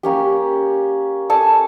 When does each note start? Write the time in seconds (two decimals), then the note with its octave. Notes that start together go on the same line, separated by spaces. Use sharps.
0.03 A#3 C#4 G4
1.30 A4 G#5 A5